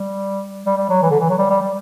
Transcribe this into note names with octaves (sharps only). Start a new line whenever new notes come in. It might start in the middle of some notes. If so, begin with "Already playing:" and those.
Already playing: G3
G3
G3
F#3
E3
D3
E3
F#3
G3
G3
G3